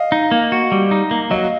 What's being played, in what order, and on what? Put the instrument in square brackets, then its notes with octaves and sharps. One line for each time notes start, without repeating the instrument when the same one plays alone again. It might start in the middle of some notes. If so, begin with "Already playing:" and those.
Already playing: [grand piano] D#5 F5
[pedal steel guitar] D#4
A#3
F#4
G3
D#4
A#3
[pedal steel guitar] F#3 [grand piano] D#5 F5